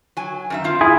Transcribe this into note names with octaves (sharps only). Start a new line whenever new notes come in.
F#3 G#5
F#2 D#3 E5
C4 F4
E4 G#4